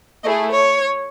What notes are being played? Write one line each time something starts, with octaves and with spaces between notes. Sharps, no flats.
A3 E4 G#4 D#5
C#5